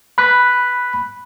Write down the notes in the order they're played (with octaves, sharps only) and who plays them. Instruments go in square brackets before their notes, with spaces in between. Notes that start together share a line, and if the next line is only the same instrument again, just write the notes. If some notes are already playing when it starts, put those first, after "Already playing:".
[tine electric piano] B5 F#6 B6